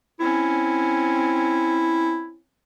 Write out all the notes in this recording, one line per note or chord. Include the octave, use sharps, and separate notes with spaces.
C4 C#4 E4